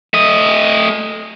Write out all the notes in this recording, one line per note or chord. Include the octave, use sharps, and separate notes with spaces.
A3 D#5